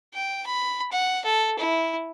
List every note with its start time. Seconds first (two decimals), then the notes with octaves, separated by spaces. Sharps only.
0.14 G5
0.46 B5
0.91 F#5
1.25 A4
1.58 E4